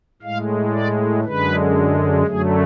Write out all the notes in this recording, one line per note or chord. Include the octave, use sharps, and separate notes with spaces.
A2 G#3 F5
D5
F#2 D3 G#3 B4
F#2 D3 F#3 A3 G#4